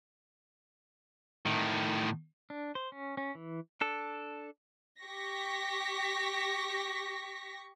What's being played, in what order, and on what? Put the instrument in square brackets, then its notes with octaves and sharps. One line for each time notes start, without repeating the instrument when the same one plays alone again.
[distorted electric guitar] A2 D#3
[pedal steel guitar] D4
C5
C#4
C#4
E3
[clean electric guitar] D4 A4
[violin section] G4 C#6 A#6 B6